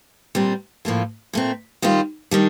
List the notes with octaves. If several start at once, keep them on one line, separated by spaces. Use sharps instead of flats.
A#2 G3 C4
A2 F3 A#3 F4 A4
A#2 A3 C4
D#3 G3 C4 F4
D#3 G3 D4